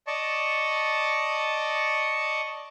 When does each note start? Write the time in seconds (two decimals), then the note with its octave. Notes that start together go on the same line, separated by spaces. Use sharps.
0.07 D5 D#5 A5 C#6